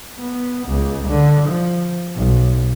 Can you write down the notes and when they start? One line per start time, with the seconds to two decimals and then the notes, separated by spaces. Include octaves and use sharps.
0.19 B3
0.67 C#2
1.09 D3
1.48 F3
2.16 B1